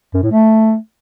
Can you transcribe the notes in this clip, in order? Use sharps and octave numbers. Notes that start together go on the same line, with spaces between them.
F#2
A2
A3